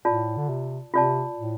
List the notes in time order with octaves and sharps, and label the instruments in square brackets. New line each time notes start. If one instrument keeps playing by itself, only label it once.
[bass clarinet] A2 [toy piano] F4 D5 A5
[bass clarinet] D3
C3
[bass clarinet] C3 [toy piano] F4 D5 A5
[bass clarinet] A2